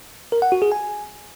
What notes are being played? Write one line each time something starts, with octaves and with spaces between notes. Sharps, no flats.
A#4
F#5
F#4
G#4
G#5